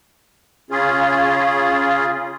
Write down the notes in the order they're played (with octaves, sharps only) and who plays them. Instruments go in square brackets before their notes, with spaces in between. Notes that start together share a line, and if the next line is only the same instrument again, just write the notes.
[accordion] C#3 C#4 F4 G#4